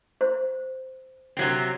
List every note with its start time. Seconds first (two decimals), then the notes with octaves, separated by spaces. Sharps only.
0.21 C5
1.37 C3 F#3 C4